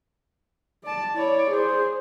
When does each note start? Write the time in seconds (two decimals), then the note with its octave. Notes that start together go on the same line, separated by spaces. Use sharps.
0.83 D5 A5
1.14 E4 C#5 D5
1.50 G#4 C5